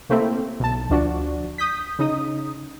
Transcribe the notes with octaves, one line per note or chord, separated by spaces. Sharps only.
C3 A3 A#3 C4 E4
B1 A5
D2 F3 D4 F#4
D#6 G6 B6
C#3 D#4 D#6